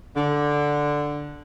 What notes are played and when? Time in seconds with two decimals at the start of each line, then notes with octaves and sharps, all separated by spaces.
0.16 D3